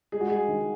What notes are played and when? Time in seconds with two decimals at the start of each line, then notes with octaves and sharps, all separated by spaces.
0.12 G#3 G#4
0.21 F#4
0.30 G#3 G#4
0.48 D#3